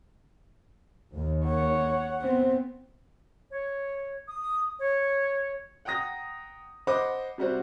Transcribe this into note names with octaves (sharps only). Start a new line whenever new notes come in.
D#2
C#5 F#5
B3 C4
C#5
D#6
C#5
F#5 G5 A#5 D#6 A#6
C5 D#5 F#5 B5 D6
C3 G3 F#4 C5